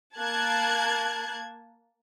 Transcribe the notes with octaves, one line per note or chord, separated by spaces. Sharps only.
A#3 A5 F#6 G#6